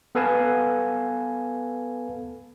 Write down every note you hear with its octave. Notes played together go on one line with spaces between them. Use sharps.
B3 A4 B4 F5 G#5 A5